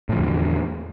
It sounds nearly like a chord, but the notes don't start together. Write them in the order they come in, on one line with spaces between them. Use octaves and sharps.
A2 F3 D3 E2